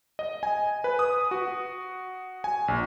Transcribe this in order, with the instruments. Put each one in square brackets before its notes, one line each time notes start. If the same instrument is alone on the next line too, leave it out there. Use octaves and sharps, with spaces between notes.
[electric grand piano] D#5
G#5
B4
D#6
F#4
G#5
A#1